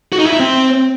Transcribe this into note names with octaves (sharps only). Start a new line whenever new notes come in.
F#4
D#4
E4
E5
C4